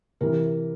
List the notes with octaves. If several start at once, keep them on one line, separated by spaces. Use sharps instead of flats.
C3 E3 A#4